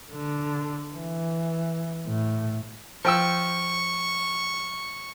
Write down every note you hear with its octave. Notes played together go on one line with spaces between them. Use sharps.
D3
E3
A2
F3 G5 C#6 E6